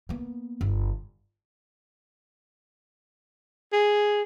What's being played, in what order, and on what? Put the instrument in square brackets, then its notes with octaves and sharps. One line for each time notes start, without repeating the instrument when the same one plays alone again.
[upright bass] A#3 B3
G1
[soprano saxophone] G#4